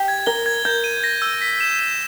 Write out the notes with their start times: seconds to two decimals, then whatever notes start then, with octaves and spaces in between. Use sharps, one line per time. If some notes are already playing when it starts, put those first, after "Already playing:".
Already playing: G4
0.08 G#6
0.26 A#4 G7
0.46 G#6
0.65 A#4 G6
0.84 D#7
1.04 A#6
1.22 E6
1.41 B6
1.60 E7
1.79 E7